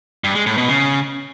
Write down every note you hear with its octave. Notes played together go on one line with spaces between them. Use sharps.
G2
G#3
A2
B2
C#3